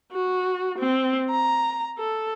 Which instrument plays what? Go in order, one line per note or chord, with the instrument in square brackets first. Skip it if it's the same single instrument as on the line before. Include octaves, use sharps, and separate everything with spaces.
[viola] F#4
C4
A#5
A4